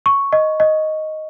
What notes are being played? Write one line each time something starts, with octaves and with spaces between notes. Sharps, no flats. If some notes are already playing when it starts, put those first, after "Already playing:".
C#6
D#5
D#5